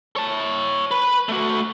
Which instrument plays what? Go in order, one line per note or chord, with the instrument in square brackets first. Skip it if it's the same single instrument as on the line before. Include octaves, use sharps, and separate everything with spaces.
[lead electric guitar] C#5 A5
B4
A3 F#4